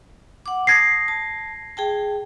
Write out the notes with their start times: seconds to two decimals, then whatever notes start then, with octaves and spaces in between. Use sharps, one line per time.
0.46 F#5 D6
0.67 A5 D#6 G#6 A#6 C7
1.08 A5
1.77 G#4 G5 A5